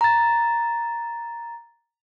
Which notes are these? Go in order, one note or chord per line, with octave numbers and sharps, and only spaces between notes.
A#5 A6